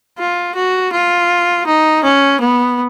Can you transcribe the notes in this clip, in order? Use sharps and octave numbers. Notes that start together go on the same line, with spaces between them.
F4
F#4
F4
D#4
C#4
B3